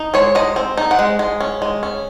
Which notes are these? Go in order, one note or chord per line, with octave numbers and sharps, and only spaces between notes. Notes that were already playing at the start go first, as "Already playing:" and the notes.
Already playing: D#4
G#3 C#5
G#3 D#5
C4
D#4
F#5
G#3
G#3
C#4
G#3
C#4